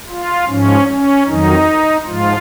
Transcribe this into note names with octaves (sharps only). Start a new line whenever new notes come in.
F4
G#2 F3 C#4
C#4
F2 D#3 F#3 D#4
G#2 F3 F4